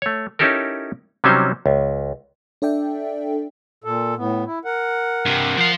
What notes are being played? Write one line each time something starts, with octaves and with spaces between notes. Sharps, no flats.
A3 C#5
C#4 D#4 E4 G4 A4 A#4
C3 F#3 G3 C#4 D#4 C5
C#2
D4 A4 D5 E5 G5
A#2 A4
A2 B3
E4
A#4 F#5
G2 C3
F3 F5